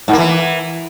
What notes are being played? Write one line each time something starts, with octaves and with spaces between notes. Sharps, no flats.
G#2
A#3
E3